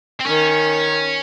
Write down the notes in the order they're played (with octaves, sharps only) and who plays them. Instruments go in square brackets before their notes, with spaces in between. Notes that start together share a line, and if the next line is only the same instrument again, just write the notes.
[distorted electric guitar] C4
[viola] D#3 [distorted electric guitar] C#4